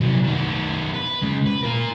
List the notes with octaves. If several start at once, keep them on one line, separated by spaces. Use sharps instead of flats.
C3 F#3
D#3 B3
B4
C#3 G#3
B4
F4 A#4